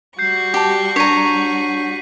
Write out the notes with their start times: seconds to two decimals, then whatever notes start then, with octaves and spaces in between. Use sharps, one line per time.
0.19 G3 F#4 C#6 G6 C7
0.54 G4 A5
0.96 D4 C#5 A#5 B6 D#7